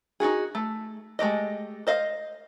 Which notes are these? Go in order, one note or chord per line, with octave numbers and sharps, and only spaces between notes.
D#4 F4 F#4 G#4
A3
G#3 A3 G4 D#5
C5 D#5 F5